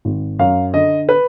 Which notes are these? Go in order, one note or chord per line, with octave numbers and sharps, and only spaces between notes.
G#1
F#2 F5
D3 D#5
B4